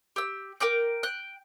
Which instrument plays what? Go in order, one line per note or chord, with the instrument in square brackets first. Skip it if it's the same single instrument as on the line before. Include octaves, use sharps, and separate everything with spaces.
[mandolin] G4 E6
A#4 G5 D6 G6
G5 F#6